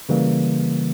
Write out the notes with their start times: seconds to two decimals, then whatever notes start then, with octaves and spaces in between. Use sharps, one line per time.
0.09 C#3 E3 G3 A#3